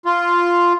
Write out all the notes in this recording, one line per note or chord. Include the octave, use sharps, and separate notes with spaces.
F4